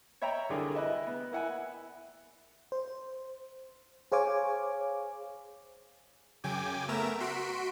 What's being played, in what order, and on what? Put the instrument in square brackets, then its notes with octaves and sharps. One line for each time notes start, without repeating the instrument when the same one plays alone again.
[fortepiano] C#5 D#5 E5 G5 A#5 B5
C2 D3 G4 G#4 A#4
E4 B4 D#5 E5
B3
A#3 E4 F#5 G#5
[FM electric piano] C5
G#4 C5 C#5 F5 G#5 D6
[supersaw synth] F#2 C#3 G5 G#5 D6
A3 B3 A#4 E5 A#5 E7
F#4 C6 B6 D7